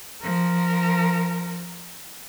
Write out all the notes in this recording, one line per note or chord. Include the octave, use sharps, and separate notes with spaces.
F3 A#4